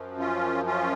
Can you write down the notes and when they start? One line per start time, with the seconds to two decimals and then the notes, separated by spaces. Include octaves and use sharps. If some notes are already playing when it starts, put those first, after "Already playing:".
Already playing: F#2 F3
0.18 C#4 F4
0.66 C#4 F4